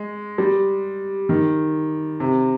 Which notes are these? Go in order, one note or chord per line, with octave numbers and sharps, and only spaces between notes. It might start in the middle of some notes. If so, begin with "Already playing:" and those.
Already playing: G#3
G3
D#3
C3